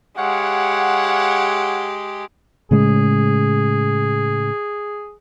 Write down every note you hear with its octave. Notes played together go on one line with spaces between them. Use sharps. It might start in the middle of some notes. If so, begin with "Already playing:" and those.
G#3 G4 C#5 F5 F#5
A2 C#3 G#3 G#4